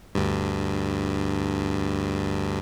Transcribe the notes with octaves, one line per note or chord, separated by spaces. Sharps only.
D2 G2